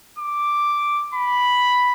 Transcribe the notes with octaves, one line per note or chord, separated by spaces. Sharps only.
D6
B5